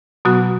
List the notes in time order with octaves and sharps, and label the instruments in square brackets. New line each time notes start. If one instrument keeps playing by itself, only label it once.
[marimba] B2 F#3 B3 F#4